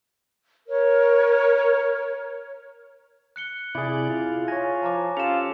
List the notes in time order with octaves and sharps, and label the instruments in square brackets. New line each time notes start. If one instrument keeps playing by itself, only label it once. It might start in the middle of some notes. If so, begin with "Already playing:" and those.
[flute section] A#4 C#5
[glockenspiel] F#6 C#7 G7
[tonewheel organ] C3 D5 [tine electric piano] E4 G#4
[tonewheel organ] F4
[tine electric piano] C#5 G#5 [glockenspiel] A#6
[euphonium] F3 [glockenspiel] A5 A#5 D6
[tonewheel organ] C#4 G4 A4 [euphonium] F4 [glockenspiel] E7 F7